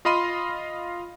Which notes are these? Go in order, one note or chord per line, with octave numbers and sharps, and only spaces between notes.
F4 D#5 F5 B5 C6 D#7